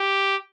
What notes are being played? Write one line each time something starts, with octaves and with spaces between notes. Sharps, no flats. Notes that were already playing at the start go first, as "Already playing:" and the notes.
Already playing: G4